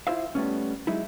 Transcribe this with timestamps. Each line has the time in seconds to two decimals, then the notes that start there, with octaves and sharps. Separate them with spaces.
0.07 E4 F4 C5 E5 F5
0.35 G3 A3 B3 C#4
0.87 F#3 G#3 D#4 E4